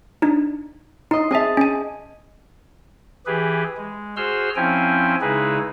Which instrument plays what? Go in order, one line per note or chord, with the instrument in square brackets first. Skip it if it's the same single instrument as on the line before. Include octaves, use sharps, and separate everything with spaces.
[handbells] D4 D#4
[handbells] D#4 [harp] D#5 C6
[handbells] C4 E5 [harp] G#4 D#5 A5
[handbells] C#4 G#5
[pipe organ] E3 G4 G#4 B4
G#3
F#4 G#4 C5 C6 E6 F6
F3 C4 C#4 E4 G5 G#5
C#3 G#3 D#4 E4 G#4 B4